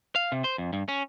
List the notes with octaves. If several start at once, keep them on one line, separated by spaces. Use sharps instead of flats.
F5
C3
C5
F2
G2
C#4